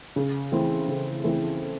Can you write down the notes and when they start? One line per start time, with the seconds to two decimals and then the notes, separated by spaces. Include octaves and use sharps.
0.16 C#3
0.52 E3 A3 C4 E4
0.88 C#3
1.24 E3 A3 C4 E4